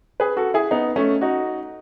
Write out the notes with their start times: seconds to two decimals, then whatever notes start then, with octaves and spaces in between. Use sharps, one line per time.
0.20 G#4 B4
0.37 F#4 A4
0.54 E4 G#4
0.71 B3 D#4
0.96 A3 C#4
1.21 D#4 F#4